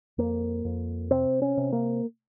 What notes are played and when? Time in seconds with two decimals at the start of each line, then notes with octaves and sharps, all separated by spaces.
0.18 F2 A#3
0.65 F2
1.11 C3 C4
1.42 C#4
1.57 C3
1.73 A#3